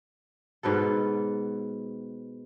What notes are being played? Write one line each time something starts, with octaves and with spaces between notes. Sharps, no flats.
G#2 B2 B3 A4